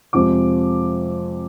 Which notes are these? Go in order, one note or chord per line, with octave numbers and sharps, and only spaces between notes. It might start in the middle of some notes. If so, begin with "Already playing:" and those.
F2 C3 F3 G#3 D6